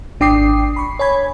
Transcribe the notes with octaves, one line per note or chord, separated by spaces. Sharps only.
G#1 D4 G5 D6 D#6 C7
B5 C#6
C#5 G#5 B5 G#6